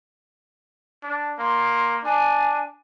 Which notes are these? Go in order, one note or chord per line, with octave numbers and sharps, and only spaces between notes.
D4
A#3 C6
D4 G#5